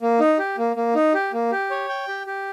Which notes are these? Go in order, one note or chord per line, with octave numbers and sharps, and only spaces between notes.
A#3
D#4
G4
A#3
A#3
D#4
G4
A#3
G4
C#5
G5
G4
G4